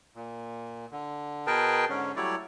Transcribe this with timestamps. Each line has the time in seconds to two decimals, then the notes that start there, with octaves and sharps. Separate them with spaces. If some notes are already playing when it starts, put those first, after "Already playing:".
0.15 A#2
0.92 D3
1.47 B2 G#4 A#4 B4 G5 A5
1.89 G#2 D3 C#4
2.16 F#3 G3 A3 E4 C#5 D5